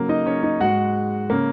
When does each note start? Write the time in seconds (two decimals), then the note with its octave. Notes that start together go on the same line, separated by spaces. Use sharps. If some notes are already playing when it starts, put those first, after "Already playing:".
Already playing: C#3 F#3 A#3
0.09 D#4 D#5
0.26 C#4 C#5
0.43 D#4 D#5
0.60 G#2 G#3 F#4 F#5
1.30 C#3 A#3